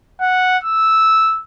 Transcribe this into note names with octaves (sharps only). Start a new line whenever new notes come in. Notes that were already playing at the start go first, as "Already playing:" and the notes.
F#5
E6